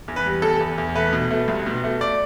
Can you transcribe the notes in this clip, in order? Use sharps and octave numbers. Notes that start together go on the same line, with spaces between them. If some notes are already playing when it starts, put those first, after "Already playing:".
E2
B4
G3
E2 A4
E2
E2
A3 B4
B2
A3
C2
B2
A3
D5